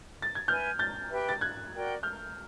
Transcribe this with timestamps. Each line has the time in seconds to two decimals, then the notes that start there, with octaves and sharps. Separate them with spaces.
0.22 A6
0.35 G#6
0.48 B4 E5 G#5 F6 G6
0.79 G6 A6
1.10 G4 B4 E5 G5
1.29 A6
1.41 F#6 G#6
1.73 F#4 A#4 D5 G5
2.03 F6 G6